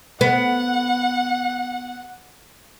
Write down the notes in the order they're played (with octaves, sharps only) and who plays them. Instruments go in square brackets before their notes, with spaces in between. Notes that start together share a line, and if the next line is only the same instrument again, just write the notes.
[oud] B3 [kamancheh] F#5